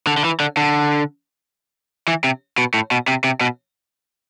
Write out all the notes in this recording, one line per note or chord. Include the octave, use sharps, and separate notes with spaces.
D3
D3
E3
D3
D3
E3
C3
B2
A2
B2
C3
C3
B2